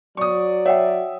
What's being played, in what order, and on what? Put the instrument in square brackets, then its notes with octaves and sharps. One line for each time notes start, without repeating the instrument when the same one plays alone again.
[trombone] F#3 [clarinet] D5 [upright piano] C#6 D#6
[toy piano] C#5 F#5 G5 [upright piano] E5